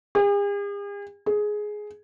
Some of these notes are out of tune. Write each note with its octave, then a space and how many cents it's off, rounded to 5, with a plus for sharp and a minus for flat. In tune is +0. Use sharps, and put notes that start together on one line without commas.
G#4 -45
G#4 +10